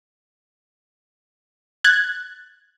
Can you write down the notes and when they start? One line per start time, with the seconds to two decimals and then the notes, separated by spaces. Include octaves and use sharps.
1.84 F#6 G#6 A6